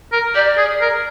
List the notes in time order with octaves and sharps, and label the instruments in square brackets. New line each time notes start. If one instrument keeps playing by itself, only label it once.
[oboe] A#4
[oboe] G4 [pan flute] D5
[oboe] G#4
A#4